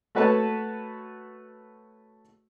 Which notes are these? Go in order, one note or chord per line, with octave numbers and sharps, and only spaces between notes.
A3 F#4 B4 C#5 A5